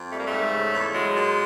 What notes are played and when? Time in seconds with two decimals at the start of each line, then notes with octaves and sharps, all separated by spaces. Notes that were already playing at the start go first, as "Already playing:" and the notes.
Already playing: F2
0.11 G3 A3
0.19 A#3
0.27 G#2 A3
0.52 C#3
0.74 E2
0.94 F#3 G#3
1.15 A#2